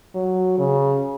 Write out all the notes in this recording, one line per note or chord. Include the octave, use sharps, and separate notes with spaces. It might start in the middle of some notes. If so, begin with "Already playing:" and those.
F#3
C#3